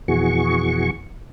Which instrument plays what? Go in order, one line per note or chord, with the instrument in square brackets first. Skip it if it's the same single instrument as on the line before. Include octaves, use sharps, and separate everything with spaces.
[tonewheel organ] F2 B2 E3 F#4 G#4 C#6